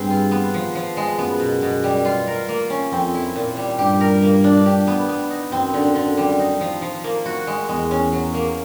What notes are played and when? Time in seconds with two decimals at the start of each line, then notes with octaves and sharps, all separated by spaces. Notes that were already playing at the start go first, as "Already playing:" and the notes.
Already playing: G2 C4 G#4 B4
0.10 F4
0.31 B3
0.54 F3
0.75 F3
0.97 G#3
1.19 F#2 B3
1.40 B2
1.62 B2
1.84 G3
2.05 F4
2.27 A#4
2.49 A#3
2.70 C#4
2.92 F2 C4
3.14 E4
3.36 A#2
3.57 G3
3.79 G2 G4
4.00 A#4
4.22 A#3
4.44 D4
4.66 G4
4.87 B3
5.09 B3
5.30 D#4
5.52 F#2 C4
5.74 D3
5.95 D3
6.17 G3
6.39 D#4
6.61 F3
6.82 F3
7.04 A#3
7.26 F#4
7.47 G#3
7.69 E2 G#3
7.91 C#4
8.12 F#3
8.34 A#3